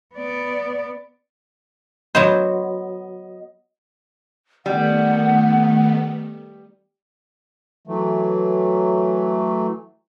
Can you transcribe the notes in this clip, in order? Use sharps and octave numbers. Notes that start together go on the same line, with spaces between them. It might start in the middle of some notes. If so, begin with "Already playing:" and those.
B3 D5
F#3 B3 C5 D#5
D#3 G3 A3 B3 F#5
E3 F#3 A3